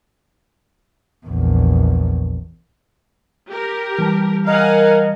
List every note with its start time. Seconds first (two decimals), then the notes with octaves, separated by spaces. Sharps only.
1.27 A#1 E2
3.50 G4 A#4
3.99 E3 G3 A5
4.47 A#4 D#5 F5 F#5 G#5